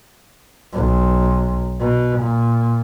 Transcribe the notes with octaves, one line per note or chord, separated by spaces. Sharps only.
B1
B2
A#2